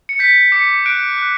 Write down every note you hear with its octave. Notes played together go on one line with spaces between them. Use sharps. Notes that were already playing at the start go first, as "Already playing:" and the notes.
C#7
G6 B6
D6 C#7
F#6 D7
F#6